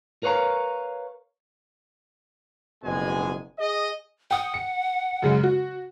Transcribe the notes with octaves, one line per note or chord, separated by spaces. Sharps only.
A#4 B4 C#5 F5 A#5
F#1 F2 B2 G#3 G#5
G#4 D#5
F#5 G5 D#6
C#7
F#2 C#3 G#3
F#4